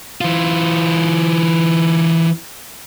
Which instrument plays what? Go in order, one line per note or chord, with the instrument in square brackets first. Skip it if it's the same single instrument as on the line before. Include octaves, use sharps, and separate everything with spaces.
[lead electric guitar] E3 F4